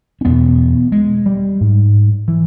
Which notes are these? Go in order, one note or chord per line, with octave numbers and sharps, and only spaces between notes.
C#4
E2 B2 B3
G#3
G3
G#2
E3